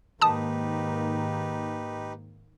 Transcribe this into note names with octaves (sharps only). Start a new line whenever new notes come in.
G#2 D#3 A#3 D#4 G4 B4 A5 D#6